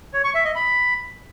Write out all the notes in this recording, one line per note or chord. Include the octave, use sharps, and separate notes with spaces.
C#5
C#6
E5
D#5
B5